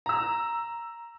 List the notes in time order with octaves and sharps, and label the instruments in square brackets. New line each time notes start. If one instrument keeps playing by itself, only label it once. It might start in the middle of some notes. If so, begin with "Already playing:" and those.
[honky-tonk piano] A#5 E6